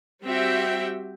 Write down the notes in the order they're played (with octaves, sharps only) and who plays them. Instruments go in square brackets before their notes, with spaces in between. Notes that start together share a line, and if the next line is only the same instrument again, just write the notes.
[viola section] G3 C4 F#4 G4 E5 G5